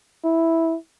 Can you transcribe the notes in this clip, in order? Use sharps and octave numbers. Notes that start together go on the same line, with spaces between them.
E4